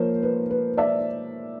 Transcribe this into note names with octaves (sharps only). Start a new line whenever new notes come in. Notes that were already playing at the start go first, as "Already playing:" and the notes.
Already playing: F3 A#3 A#4 C5 C#5
B4
B4
D5 E5